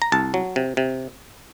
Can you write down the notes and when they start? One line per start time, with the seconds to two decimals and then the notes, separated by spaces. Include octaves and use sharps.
0.02 A#5
0.12 C2 A5
0.34 F#3
0.56 C3
0.77 C3